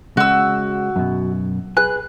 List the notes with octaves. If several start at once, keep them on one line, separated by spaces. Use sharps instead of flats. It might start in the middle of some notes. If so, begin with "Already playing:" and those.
C#3 G#3 F#4 E6
F#2 B2
G#4 B4 G#5 F#6